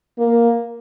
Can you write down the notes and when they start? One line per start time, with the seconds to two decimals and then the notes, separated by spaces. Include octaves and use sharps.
0.18 A#3